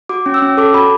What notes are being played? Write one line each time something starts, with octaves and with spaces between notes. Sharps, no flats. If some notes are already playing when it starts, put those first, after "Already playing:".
F#4 D6
C#4
E6
C#4
A4 D6
F#4 B5